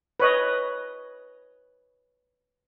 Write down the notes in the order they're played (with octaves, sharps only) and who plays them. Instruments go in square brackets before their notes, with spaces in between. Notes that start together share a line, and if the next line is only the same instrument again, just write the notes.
[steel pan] B4 C#5 D#5